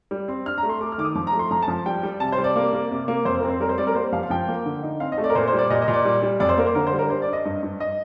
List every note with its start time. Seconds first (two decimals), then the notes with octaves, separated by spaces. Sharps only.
0.11 G3
0.28 C4
0.46 D4 F6
0.58 A#5
0.63 A3
0.69 C6
0.81 A3 D6
0.92 F6
0.98 D#3 D6
1.04 D#6
1.15 F3 D6
1.27 A#5
1.33 A3
1.39 C6
1.51 F3 A#5
1.62 A5
1.68 F3
1.86 G3 G5
2.03 G3
2.20 C3 A5
2.32 C5
2.38 G3
2.44 D5
2.56 A#3
2.73 A#3
2.91 C3
3.08 A#3
3.25 F2 C5
3.39 C4 A#4
3.49 C5
3.60 G3 A#4
3.69 C5
3.78 G3 D5
3.87 A#4
3.95 A#3 C5
4.13 F3 F5
4.23 F5
4.30 F3 G5
4.48 A#3
4.65 D3
4.83 D#4
5.00 C4 F5
5.12 D#5
5.18 A3
5.24 D5
5.30 A#4
5.35 A#2 C5
5.47 C5
5.53 G3
5.59 D5
5.70 A#2 D#5
5.82 D#5
5.88 A#2
5.93 D5
6.05 G3
6.22 G3
6.40 F2 D5
6.49 C5
6.58 A#3 A#4
6.66 C5
6.75 D3 A#4
6.87 C5
6.93 G3
6.99 A#4
7.10 D4 C5
7.22 D5
7.28 D4
7.33 D#5
7.45 G2 D#5
7.63 G2
7.80 D#5